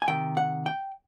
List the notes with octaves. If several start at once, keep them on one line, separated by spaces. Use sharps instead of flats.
G#5
C3 D#3 G5
F#5
G5